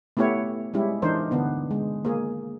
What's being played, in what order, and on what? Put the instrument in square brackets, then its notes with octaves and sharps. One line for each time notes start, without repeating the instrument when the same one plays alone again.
[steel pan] A3 B3 E4 G4 C#5
G3 G#3 C#4 E4 G4
E3 D4 D#4 A#4 C5
D3 B3 D4
G#3
A#3 G#4